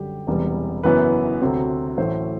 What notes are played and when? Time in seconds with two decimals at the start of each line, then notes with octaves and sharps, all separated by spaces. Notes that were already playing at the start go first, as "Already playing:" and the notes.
Already playing: F#2 D3 G3 G4
0.27 E1 E2 C3 G3 B3
0.83 F#1 F#2 E3 B3 B4
1.41 D2 C3 F#3 C4
1.97 A1 A2 F#3 A3 C5